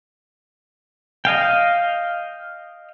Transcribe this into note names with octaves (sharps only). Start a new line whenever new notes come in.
D#5 F5 G5